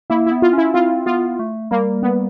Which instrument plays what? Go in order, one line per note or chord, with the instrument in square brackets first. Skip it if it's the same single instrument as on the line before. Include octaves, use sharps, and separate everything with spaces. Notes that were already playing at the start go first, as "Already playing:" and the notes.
[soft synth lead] A#3 [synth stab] E4
[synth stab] E4
[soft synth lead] B3
[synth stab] F4
[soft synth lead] C#4 [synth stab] E4
[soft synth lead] C4 [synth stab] F4
[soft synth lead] B3 [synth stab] F4
[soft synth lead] A3
[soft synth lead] G3 [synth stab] A#3
[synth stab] B3